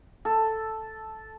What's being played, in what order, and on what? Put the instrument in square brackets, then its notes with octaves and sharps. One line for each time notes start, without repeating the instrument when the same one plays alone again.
[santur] A4